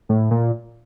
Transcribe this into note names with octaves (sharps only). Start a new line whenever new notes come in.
A2
A#2